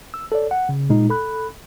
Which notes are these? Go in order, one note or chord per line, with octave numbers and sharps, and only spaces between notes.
E6
A4 C#5 D5
F#5
C#3
A#2 G#3 D#4
A4 B5 F#6